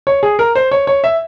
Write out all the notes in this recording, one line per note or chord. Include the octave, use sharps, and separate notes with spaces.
C#5
G#4
A#4
C5
C#5
C#5
E5